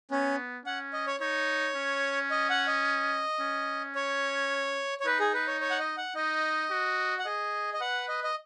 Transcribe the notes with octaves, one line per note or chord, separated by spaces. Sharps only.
B3 C#4
C#4 F#5
D#5
C#5
D#4 C#5
C#4
D#5
F#5
D#5
C#4
C#5
C#5
D#4 B4
G#4
B4
C#5
C#5
F#5
D#5
F#5
D#4 D#5
F#4
F#5
G#4 D#5
D#5
B4 F#5
D#5
D#5